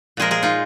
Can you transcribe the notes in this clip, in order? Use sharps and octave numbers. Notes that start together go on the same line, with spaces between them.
A#2 F3 G#3 G#4 A#4
G#4 A#4
D#4 F4